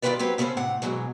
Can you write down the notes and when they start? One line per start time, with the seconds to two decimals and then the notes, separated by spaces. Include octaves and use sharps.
0.02 G2 D#3 F4 G4 B4 D5
0.19 F#3 C4 G4 B4
0.38 C#3 B3 C#4 A4 C5
0.57 A2 C3 F#5
0.82 G#2 B2 E3 F#3 G#3